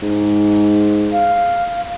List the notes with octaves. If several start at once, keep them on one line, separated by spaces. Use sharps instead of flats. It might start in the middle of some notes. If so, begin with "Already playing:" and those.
G#2
F5